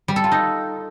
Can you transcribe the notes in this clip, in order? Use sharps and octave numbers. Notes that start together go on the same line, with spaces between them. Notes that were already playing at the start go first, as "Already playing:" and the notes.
G3
A4
F4
D#4